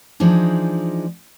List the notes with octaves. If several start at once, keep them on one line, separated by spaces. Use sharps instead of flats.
E3 F3 G#3 D4 D#4